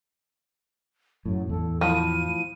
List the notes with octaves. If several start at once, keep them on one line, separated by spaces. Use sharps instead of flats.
F#2 A2 F#3
E2 A2 A4
F3 E4 D#7